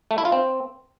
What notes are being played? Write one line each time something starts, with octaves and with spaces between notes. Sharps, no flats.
A3
E4
F4
C4